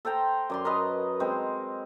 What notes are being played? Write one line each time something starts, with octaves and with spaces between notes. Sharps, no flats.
A4 C5 G5 A#5
F#2 D5 C6
A#4 B4 D#5 A5
G#3 C4 A#4 C5